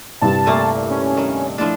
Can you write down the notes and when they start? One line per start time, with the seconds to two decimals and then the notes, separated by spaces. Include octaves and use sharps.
0.21 C2 G2 C3 A5
0.46 A#2 A3 A#3
0.90 C#4
1.17 D#3
1.58 F3 A3 D4 E4